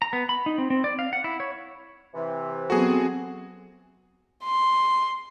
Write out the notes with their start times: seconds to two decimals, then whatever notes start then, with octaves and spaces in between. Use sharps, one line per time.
0.02 A#5
0.13 B3
0.29 B5
0.46 D#4
0.58 C4
0.70 C4
0.84 D5
0.99 F5
1.13 F#5
1.24 E4
1.40 C#5
2.14 C3 E3
2.70 F#3 B3 C4 F#4 G#4 A4
4.44 C6